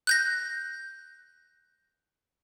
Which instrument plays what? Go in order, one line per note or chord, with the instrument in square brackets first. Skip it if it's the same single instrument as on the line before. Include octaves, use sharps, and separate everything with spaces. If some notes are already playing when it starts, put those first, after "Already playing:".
[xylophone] F#6 G6 A#6